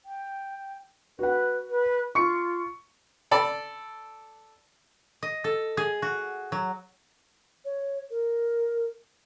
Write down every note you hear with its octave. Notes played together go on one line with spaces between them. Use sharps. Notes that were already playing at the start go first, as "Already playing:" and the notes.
G5
F#4 B4 F#5
B4
F4 C#6 C#7
A4 D5 B5
D#5
A4
G#4
F#4
F#3
C#5
A#4